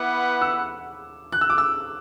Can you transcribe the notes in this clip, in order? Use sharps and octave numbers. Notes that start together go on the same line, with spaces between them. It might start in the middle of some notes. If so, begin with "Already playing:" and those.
Already playing: B3 E4 B4 F#5 D6
E6
F#6
E6
D6
E6